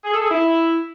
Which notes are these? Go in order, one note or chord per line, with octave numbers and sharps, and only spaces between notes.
G#4
A4
G#4
E4